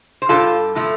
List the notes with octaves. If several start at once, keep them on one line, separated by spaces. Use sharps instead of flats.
C5
G2 G3 F4 A4
A2 F3 A3